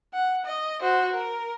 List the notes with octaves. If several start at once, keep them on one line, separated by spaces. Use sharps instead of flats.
F#5
D#5
F#4 C5
A#4